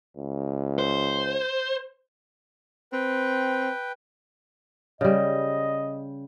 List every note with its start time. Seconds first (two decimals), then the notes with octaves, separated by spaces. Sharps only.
0.17 C#2
0.79 C5
2.93 C4 B4 G5
5.01 C#3 G3 D#5